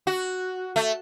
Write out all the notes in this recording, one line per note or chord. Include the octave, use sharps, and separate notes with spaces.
F#4
A3